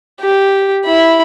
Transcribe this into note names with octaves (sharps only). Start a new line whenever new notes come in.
G4
E4 B5